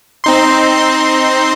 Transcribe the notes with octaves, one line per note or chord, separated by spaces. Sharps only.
C4 D#4 C6